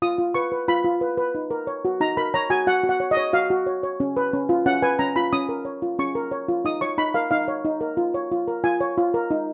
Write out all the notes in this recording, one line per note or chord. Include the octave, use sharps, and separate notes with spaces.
F4 D#6
F4
B4 C#6
B4
F4 B5
F4
B4
B4
D#4
A#4
C#5
F#4
D#4 A#5
A#4 B5
C#5 A#5
F#4 G#5
F#4 F#5
F#4
F#5
C#5
D#5
C#5
F#4 F5
F#4
C#5
C#5
C#4
B4
C#4
F4
C#4 F#5
B4 G#5
C#4 A#5
F4 B5
C#4 D#6
A#4
C#5
F4
C#4 C#6
A#4
C#5
F4
D#4 D#6
C#5 C#6
D#4 B5
A#4 F5
D#4 F5
C#5
D#4
A#4
F4
C#5
F4
A#4
F4 G#5
C#5
F4
A#4
D#4